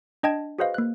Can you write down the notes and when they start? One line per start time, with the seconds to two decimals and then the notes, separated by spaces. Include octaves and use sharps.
0.23 D4 D#5 G5 A5 G#6
0.59 F#4 G#4 B4 C5 D#5 F5
0.74 A#3 F#6